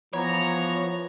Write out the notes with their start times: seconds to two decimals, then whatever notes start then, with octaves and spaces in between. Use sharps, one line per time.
0.14 E3 F3 B3 C#5 A#5